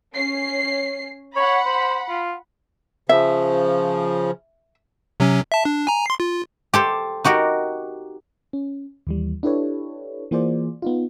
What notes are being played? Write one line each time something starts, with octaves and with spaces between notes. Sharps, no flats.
C#4 C7
C#5 F#5 B5
C5
F4
C#3 F3 E5
C3 F#3 C#4
E5 A5
D4
G#5 A#5
C6 C7
F4
G4 A4 C5
D#4 F#4 G4 A#4
C#4
D#2 E3 G3
D4 E4 G4 A4 B4 C#5
E3 A#3 F4 G#4 C5 D5
B3 D#4 F4